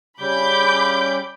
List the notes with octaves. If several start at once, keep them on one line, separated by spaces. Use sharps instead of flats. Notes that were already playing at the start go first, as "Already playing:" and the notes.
C#3 G3 B5 D6 G6